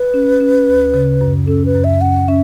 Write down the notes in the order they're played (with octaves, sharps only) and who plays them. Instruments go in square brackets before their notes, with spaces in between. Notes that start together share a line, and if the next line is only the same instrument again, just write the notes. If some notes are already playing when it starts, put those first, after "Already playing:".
Already playing: [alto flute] B4
[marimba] C#4
C#4
D2
C#3
F#2
[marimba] C#4 [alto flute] A4
[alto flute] B4
[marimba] F#2
[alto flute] E5
[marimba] C#4 [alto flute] F#5
[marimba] C#4 [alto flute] E5